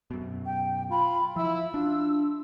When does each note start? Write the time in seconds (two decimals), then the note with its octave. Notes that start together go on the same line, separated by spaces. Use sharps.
0.11 F#2 B2
0.45 G5
0.90 F4 B5
1.36 F3 E4 E6
1.74 D4 F4